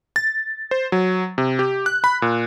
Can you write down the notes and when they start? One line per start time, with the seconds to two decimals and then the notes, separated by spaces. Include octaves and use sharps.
0.16 A6
0.71 C5
0.92 F#3
1.38 C3
1.59 G4
1.86 F#6
2.04 B5
2.22 A#2